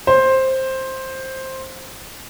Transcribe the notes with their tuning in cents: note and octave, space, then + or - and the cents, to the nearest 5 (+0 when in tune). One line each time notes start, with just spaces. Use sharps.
C5 +10